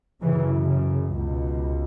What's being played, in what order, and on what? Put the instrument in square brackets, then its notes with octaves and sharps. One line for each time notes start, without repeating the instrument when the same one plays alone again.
[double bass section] F#2 C#3 E3
C#3
C#2 B2